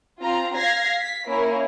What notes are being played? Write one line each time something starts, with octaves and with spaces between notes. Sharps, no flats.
C4 F4 A#5
F5 G#6 A#6 C7
B6
A#3 C#4 E4 A#4